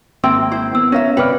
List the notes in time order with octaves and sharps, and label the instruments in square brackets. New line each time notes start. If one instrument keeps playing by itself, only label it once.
[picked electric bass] G#1 A#3 C4 [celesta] E5 C6 E6 [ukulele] G5
[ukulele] E4 C5
[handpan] B3 [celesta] E6
[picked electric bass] C#4 [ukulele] A#4 E5 [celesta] C#5 F5
[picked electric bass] G1 C3 C#4 [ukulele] B4 D5 [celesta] G5 F6